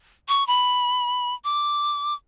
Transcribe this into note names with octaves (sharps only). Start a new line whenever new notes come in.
C#6
B5
D6